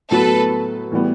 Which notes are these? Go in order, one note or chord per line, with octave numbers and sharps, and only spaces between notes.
A2 F#3 B3 A4 B4
A2 E3 G3 B3